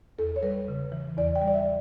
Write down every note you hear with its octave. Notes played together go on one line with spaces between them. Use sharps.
E2 A4
C#5
G3 B4
C#3
E3
E2 D5
G5
G3
D5
E5